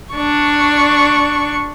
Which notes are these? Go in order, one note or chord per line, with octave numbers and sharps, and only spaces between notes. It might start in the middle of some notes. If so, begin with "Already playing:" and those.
D4 C#6